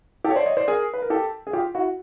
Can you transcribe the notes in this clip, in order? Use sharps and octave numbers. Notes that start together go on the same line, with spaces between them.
G4 A4
C#5
C5 D5
C#5 D#5
C5 D5
G#4 A#4
B4
A#4
G4 A4
G#4
F4 G4
E4 F#4